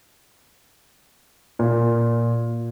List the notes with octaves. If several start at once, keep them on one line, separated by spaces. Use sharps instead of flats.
A#2